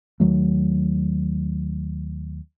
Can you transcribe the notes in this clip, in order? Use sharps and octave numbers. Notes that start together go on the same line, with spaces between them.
D#2 D#3 F#3 A3